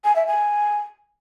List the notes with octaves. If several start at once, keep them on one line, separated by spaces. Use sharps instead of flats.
G#5
E5
G#5